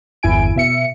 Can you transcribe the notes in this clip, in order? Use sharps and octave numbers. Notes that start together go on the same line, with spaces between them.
G1 E2 E4 G#5 D7
B2 E5 C#7